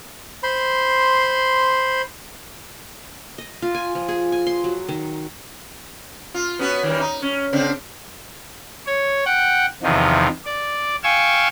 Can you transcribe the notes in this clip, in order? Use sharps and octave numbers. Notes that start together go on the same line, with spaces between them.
C5 B5 C6
D#5
F4
G#5
F3
G#4
G#5
C6
F#3
D#3
F4
B3 C#4 F#4
D#3 E3 G3
D#4
C#4
C#3 C4 D4
C#5
F#5 G5
E2 C3 D#3 F3
D5
F5 G5 G#5 C#6 E6